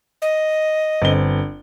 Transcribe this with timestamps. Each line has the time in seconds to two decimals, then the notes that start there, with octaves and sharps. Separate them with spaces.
0.22 D#5
1.02 G1 C4 G7